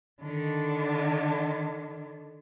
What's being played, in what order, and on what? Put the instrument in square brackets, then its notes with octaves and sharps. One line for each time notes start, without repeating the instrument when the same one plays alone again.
[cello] D3 D#3